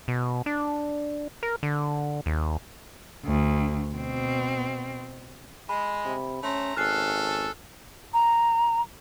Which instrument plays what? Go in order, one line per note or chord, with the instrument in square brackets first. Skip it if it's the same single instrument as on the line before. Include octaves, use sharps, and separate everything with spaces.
[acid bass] B2
D4
A#4
D3
D#2
[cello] D2
B2 C4
[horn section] G#3 [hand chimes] B5
[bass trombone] C3
[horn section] A3 C5 A#5 [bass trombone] C#4
[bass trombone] G#1 [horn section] C#4 A4 [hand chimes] F6 F#6 C7
[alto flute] A#5